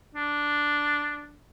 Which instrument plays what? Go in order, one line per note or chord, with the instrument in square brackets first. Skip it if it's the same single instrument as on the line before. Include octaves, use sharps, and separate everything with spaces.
[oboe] D4